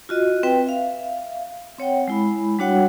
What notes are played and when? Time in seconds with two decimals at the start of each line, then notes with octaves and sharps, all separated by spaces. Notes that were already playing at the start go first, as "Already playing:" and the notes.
0.09 F4 F#4 D#5
0.43 C4 B4 G5
0.66 E5 F5
1.78 C4 C#5 F#5 G5
2.08 G#3 E4 B5
2.59 G3 D4 F#4 C#5 F#5 G5